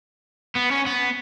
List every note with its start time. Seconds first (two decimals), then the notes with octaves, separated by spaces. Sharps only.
0.56 B3
0.71 C#4
0.86 B3